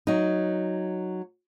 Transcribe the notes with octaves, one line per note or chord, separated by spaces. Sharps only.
F#3 D#4